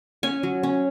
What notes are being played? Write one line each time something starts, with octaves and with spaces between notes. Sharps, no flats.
C#4 G#5
F#3
C#4